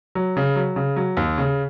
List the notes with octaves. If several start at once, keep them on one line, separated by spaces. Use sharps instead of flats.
F#3
C#3
F#3
C#3
F#3
D#2
C#3